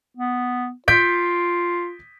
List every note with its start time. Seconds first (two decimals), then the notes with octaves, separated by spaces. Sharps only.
0.17 B3
0.88 F4 G6 B6 D7